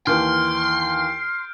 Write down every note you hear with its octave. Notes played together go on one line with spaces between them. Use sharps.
D#2 E3 C6 F6 G6 D7